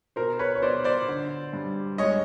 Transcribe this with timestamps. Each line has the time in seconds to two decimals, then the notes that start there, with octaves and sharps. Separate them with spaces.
0.16 B2 A#4 C5
0.39 B4 C#5
0.55 C#5
0.62 B2 C5 D5
0.84 C5 D5
1.08 D3
1.53 G2
1.98 G#3 C#5 D#5